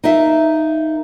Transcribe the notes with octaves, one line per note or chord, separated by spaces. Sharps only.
D#4 A#4 E5 F5